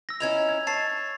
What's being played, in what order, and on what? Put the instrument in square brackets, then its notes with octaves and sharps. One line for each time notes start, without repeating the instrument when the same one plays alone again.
[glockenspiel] E6 A#6
[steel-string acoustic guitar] C#4 D#4 E4 [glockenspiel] G#6 F7
[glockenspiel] G#6
[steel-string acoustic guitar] C#5 [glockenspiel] A5 A6 C7